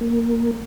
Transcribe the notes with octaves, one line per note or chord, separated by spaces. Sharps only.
A#3